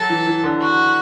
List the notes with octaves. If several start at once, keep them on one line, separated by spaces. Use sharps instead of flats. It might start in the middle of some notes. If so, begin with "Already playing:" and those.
Already playing: F#3 A4
E3
E3
D3
F#4